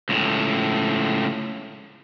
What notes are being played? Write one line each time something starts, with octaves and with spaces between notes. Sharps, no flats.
C#2 A2